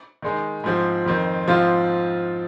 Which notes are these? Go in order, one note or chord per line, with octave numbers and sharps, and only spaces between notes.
D#3 G#3 D#4
G#2 F3 C4
F2 D#3 C4
G#2 F3 C4 F4